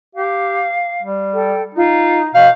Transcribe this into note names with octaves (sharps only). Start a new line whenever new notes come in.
G4 F5
G3
A4 G5
D#4 F4
B2 D#5 F5 G6